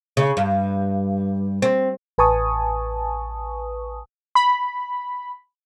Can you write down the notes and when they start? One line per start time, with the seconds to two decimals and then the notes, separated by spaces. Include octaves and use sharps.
0.17 C#3
0.37 G2
1.62 C4
2.18 A1 B4 G#5 A5 C#6 D#6
4.35 B5